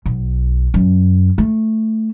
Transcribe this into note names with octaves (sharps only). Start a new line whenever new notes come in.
B1
F#2
A3